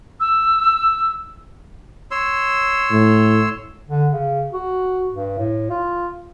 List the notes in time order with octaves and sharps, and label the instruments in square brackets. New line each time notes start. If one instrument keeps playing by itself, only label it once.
[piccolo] E6
[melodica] C#5 C6 E6
[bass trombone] A2
[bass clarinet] D3
C#3
F#4
G2
A2
F4